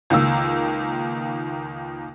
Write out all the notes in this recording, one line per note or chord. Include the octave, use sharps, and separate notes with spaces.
C#2 D#3 A#3 E6